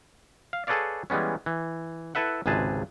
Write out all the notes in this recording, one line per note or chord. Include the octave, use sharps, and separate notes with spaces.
F5
G#4 A4 B4 C#5 D5 F5
E3 G3 G#3 B3 C#4
E3
E4 A4 B4 E5 F#5
G#1 C#2 C3 G#4 B4 A5